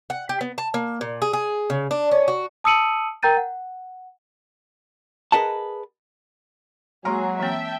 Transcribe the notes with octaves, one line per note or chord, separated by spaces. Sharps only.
F#5
G4
B3
A5
A#3
A#2
G#4
G#4
C#3
D4
C#4
F#4
A5 D#6 E6 C#7 D#7 F#7
A#4 G5 A#5 G6 A6 D#7
F#5
G#4 A#4 B4 D#5 F#5 A5
F#3 G#3 A#3 G#4 A#5 C6
E3 A#3 C4 E5 G5 A5